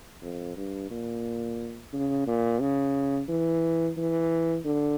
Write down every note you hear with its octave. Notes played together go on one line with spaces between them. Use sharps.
F2
G2
A#2
C#3
A#2
C#3
E3
E3
D3